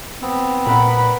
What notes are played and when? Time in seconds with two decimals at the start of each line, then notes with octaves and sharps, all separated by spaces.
0.22 B3 C4
0.66 A#2 A#4 B4 F#5 B5